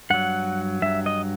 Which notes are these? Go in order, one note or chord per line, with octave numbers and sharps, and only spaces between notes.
G2 F#3 F#5
G2 F#3 E5
D#5